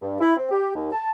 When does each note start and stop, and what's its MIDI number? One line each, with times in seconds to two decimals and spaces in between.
0.02 0.18 43
0.20 0.36 64
0.37 0.47 60
0.51 0.70 67
0.75 0.88 39
0.92 1.11 81